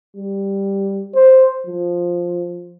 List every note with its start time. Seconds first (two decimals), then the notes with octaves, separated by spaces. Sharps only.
0.17 G3
1.15 C5
1.67 F3